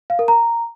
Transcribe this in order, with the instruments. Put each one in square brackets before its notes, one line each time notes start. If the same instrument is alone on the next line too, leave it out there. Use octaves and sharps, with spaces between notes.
[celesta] F5
A#4
A#5